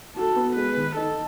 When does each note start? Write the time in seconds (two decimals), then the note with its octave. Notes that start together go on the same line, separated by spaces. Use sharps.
0.16 F#4 A4
0.36 B3
0.56 G#3 B4
0.77 D#3
0.96 D#4 A4